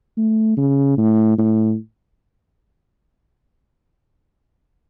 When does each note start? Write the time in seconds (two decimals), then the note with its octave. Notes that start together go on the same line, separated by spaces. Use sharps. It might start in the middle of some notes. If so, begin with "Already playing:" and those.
0.17 A3
0.57 C#3
0.98 A2
1.38 A2